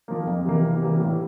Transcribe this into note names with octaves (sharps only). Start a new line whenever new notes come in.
F3 A#3
F2
C3 E3 A#3
C3
E3 G3 A#3
A2